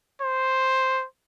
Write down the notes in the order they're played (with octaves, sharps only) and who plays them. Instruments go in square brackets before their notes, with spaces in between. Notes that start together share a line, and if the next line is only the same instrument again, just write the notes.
[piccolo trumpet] C5